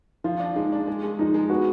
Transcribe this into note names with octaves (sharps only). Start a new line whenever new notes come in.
F3 F4
D4
G#3 D#4
D4
G#3
G#3
F3 D#4
G#3
B3 F#4